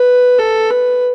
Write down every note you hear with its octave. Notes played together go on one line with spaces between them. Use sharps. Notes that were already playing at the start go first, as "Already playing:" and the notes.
Already playing: B4
A4
B4